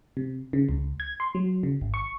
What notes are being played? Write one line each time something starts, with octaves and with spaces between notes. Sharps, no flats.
C3
C#3
C#2
G#6
C6
F#3
C#3
G#1
C#6